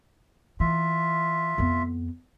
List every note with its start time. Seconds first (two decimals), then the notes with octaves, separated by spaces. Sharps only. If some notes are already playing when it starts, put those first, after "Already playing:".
0.60 E3 F4 E5
1.58 F2 B3